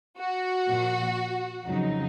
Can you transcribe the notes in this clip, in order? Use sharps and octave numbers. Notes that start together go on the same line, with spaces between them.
F#4
A#2 F3
F2 C#3 F#3 D#4